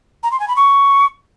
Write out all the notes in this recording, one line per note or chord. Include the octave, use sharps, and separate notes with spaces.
A#5
C6
G#5
B5
C#6